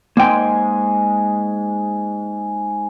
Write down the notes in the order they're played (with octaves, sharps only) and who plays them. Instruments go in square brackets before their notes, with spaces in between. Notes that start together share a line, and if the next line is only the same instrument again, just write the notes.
[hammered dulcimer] G#2 G#3 G#5 [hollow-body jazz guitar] A#3 G5